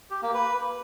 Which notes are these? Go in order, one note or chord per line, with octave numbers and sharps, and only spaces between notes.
G4
A#3
B4